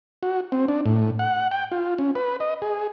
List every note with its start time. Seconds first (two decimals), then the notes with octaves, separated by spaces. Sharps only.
0.23 F#4
0.52 C4
0.68 D4
0.86 A2
1.19 F#5
1.51 G5
1.72 F4
1.98 C#4
2.15 B4
2.40 D#5
2.62 G#4